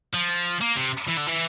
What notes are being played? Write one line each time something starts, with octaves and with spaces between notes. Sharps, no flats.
F3
A#3
C3
E3
D3
E3